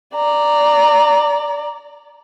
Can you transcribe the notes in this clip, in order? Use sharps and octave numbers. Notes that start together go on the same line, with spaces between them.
D5 A#5